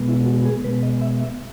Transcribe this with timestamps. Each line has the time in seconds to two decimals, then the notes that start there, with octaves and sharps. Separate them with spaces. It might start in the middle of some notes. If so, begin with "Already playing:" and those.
Already playing: B2 G#3 B3
0.08 E4
0.26 F#4
0.45 G#4
0.64 B2 G#3 B3 B4
0.83 D#5
1.01 E5
1.20 E5